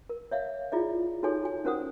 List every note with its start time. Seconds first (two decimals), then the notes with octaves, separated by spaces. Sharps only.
0.09 A#4
0.31 C#5 E5 F5
0.72 E4 F4 G#4 D5 E5
1.23 D#4 F#4 G#4 A4 C#5 G#5
1.44 F#4 G#5
1.65 C#4 F#4 A#4 C5 F#5 D#6